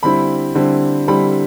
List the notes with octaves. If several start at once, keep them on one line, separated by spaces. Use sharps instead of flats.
D3 G3 C4 E4 B5
D3 G3 C4 E4
D3 G3 C4 E4 B5